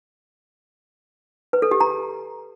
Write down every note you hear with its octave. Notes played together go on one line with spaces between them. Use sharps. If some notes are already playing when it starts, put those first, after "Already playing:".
B4
A4
G4
A#5